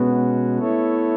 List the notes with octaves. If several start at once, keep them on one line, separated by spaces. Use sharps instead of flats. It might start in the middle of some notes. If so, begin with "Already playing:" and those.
Already playing: B2 G#3 B3 C#4 F#4
A3 E4 A4 C#5